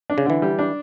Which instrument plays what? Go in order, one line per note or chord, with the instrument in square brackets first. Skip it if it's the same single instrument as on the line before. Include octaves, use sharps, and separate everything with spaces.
[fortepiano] D4
[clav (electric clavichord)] C#3
[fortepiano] D3 [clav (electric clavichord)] E3
[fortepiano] G3
D4